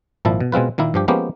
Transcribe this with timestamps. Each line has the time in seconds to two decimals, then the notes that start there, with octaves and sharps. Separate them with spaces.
0.25 G#1 A#2 F3 E4 A5
0.40 B2
0.52 B2 G#3 C4 F4 B4
0.78 A#2 D#3 A#3 E4
0.94 G2 F3 G4
1.08 F3 G#3 A#3 B3 C#4 G4